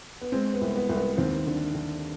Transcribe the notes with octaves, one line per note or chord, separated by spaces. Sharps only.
B3
G#3 C4
B3
C2
B3
C2
B3
D#2 C4
D3
D3